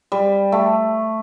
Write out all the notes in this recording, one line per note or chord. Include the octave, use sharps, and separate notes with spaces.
G3
A3